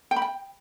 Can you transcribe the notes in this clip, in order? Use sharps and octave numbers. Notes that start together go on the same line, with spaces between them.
G5
B5
G5